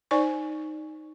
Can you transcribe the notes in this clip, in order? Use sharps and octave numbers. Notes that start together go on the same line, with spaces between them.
D#4 C5 D5 G#5 C#6